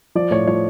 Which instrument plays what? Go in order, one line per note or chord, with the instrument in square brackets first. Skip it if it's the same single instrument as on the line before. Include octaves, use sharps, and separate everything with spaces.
[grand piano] F3 D5
A2 C#5
F3 C#5